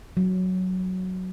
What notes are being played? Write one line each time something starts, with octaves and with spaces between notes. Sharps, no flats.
F#3